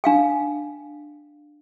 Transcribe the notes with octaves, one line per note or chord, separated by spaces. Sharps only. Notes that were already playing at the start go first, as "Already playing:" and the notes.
D4 F5 G5